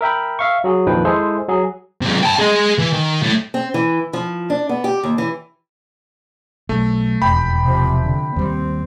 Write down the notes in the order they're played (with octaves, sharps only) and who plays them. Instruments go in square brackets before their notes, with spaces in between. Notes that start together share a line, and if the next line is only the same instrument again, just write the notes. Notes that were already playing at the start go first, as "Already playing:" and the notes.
[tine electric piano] A#4 E5 G5 B5
E5 F5 C#6
F#3 F#4 G#4
A#1 F2 D#3 F3 B4 G5
G#3 E4 G#4 A4 C5
F#3 G#4
[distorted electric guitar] C3 G#3
G5 A5
G#4 D#5
E3
D#3
A2
[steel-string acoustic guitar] C4
E3
F3
D4
B3
G4
D#2
E3
[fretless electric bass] B1 [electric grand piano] A3
[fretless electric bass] E1 [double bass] F2 [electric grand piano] G5 B5
[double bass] C3 F3
D3
[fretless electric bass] D#2 G3 [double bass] C4